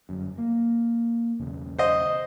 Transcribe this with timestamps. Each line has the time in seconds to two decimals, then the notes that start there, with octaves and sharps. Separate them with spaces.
0.09 G1 F#2
0.38 A#3
1.40 B1 E2 C#3
1.79 C5 D#5